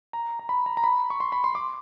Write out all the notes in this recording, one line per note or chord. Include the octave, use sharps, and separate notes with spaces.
A#5
A#5
B5
A#5
A#5
B5
C#6
C6
B5
C6
D6